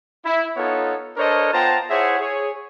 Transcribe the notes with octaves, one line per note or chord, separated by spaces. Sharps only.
E4
B3 D#4 F4 A4 C#5
D4 A4 A#4 C5 C#5 D#5
B3 F4 C5 G5 A5 A#5
E4 G#4 C5 C#5 E5 F#5
G#4 C#5